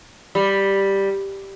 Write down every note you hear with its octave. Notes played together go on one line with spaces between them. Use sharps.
G3